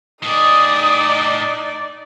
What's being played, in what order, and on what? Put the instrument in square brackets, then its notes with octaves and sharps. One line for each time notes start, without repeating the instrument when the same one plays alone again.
[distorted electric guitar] A2 G#4 [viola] D#4 D5 [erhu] D#6